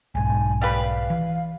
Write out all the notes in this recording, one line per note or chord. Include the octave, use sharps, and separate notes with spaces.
B1 G#2 G#5
G3 G4 B4 F5
E3